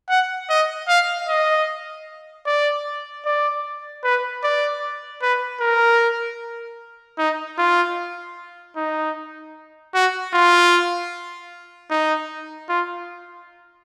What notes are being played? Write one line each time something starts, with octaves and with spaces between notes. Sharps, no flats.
F#5
D#5
F5
D#5
D5
D5
B4
D5
B4
A#4
D#4
F4
D#4
F#4
F4
D#4
F4